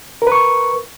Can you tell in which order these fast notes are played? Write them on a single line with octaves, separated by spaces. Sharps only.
A#4 B4 C#6